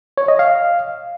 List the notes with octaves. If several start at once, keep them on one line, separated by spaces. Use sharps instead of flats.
C#5
D#5
F5